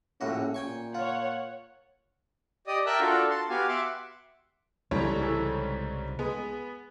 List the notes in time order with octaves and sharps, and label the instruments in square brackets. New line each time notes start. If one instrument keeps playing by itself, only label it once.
[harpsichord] A#1 A2 F#4 [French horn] C#4
[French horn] A#2 [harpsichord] G5 G#5 C#6
[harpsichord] F4 [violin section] C#5 F#5
[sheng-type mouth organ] G4 D5 D#5 D#6
A#4 E5 G5 A5 E6 F#6
D4 F4 F#4 A4
A5 C6
B3 F#4 G4 F5 G#5
E5 F#5 C6 D6
[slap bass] C2 C#3 [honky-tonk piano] G#2 G3 C#5 [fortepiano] E3 A3
[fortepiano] E3 A4
[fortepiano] G#3 [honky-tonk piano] B3